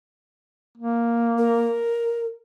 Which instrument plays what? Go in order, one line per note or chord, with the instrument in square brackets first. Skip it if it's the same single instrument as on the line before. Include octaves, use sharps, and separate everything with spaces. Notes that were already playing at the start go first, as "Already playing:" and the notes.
[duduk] A#3
[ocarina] A#4